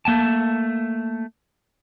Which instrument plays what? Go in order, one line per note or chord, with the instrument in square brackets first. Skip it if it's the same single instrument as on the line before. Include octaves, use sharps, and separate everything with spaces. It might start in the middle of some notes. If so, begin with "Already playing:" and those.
[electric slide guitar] A3 A#3 G5 A5